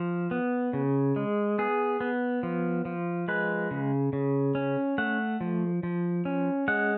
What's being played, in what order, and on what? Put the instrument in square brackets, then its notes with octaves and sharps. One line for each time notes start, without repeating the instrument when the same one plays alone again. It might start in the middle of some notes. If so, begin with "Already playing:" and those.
Already playing: [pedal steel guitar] F3
B3
C#3
G#3
B3 G#4
B3
F3
F3
G#3 B4
C#3
C#3
C#4
A3 F#5
F3
F3
C#4
G#3 F#5